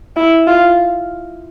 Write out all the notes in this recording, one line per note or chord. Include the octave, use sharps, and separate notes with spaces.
E4
F4